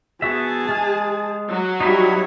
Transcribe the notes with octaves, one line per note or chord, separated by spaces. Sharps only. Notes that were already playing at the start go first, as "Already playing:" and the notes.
B3 F#4 G#4 E5 A5
G#3 F6
F#3
G3 D#4 E4 C#5 E5